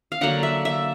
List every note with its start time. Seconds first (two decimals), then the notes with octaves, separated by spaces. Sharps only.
0.12 F5
0.21 D3 F#3 A#3 F#5
0.43 E5
0.65 E5